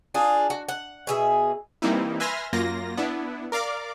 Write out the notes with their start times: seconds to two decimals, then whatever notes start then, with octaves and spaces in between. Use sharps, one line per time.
0.14 D4 F4 G#4
0.50 F#4
0.68 F#5
1.07 B2 G#4 E5
1.82 E3 G3 A#3 C4 D#4 E4
2.20 B4 E5 G#5 C6 F6 A#6
2.53 F#2 A#3 F4 A#6
2.97 B3 D4 E4
3.52 A#4 D5 F5 D6